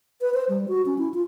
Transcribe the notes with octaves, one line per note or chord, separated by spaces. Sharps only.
B4
C5
G3
F#4
C#4
E4
F4